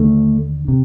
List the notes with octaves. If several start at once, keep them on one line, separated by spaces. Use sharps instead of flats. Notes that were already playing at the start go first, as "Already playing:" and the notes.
Already playing: D#2 D3 A3
C3